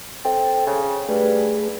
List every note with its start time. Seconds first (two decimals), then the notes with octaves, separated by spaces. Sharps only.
0.25 C4 A4
0.67 C#3
1.09 G2 A3 G#4 B4